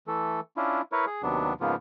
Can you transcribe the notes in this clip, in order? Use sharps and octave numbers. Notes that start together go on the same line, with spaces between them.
E3 A3 A4
C#4 D4 E4 F4
E4 A#4 B4 C#5
G#4
D#2 C3 F#3 B3 D4
G#2 C#3 F3 A#3 B3 F4